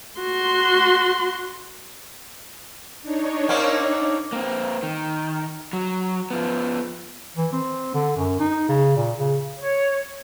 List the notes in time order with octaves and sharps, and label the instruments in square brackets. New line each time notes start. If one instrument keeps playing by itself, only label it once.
[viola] F#4 C6
[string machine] D4 D#4 C#5
[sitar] A#3 C4 C#4
[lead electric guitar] A#3 C4
D#3
F#3
F3 B3
[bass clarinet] E3
C4
D3
F#2
D#4
C#3
A#2
C#3
[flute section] C#5